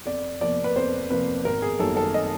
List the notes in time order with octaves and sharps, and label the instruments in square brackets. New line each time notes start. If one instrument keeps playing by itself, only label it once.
[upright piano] F2 D5
C3 F3 A#3 D5
B4
F2 C5
C3 F3 A#3 B4
G#1 A#4
G#4
F#2 D#3 G3 A#3 A4
A4
D#5